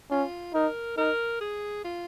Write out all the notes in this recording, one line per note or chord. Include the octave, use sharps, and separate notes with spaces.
C#4 F4
D#4 A#4
D#4 A#4
G#4
F4